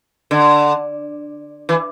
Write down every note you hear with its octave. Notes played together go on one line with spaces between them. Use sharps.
D3
E3